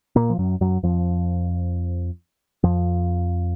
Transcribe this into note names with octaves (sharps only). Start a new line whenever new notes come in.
A#2 A#3
F3
F#2 F#3
F#2 F#3
F2 F3
F2 F3